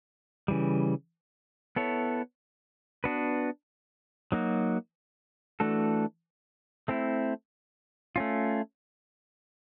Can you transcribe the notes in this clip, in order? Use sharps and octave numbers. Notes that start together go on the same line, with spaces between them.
C#3 E3 G3
B3 E4 A4 C#5
B3 D4 F#4 B4
F#3 A#3 D#4 F#4
E3 A3 D4 F#4 A4
A3 C4 E4
A3 C#4 F4